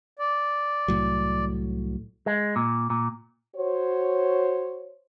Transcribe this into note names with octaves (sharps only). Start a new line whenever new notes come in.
D5
C2 A2 F#3
G#3
A#2
A#2
F#4 C5 C#5